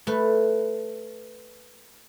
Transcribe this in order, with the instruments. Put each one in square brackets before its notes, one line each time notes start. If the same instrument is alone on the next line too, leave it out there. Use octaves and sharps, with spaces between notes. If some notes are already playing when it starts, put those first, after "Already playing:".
[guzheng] A3 B4